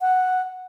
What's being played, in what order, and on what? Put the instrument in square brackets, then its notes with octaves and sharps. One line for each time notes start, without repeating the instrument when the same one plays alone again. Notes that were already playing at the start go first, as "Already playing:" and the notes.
[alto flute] F#5